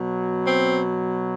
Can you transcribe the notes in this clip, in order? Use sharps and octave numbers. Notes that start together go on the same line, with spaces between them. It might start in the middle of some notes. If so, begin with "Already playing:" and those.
Already playing: B2 F#3
C4